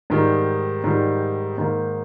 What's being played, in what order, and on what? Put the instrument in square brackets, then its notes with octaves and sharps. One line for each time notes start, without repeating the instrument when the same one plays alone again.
[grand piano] G#2 D#3 G3
G#2 D#3 G3
G#2 D#3 A#3